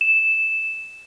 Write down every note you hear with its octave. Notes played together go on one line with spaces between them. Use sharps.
E7